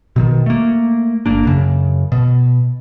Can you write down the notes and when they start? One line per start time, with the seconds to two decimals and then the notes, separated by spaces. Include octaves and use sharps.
0.16 B2 D3 D#3
0.46 A3 A#3
1.26 G1 A#3 D4
1.45 F#2 C#3
2.12 B2